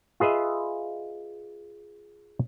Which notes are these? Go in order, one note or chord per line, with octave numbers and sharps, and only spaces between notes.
F4 G#4 B4 D#5 E5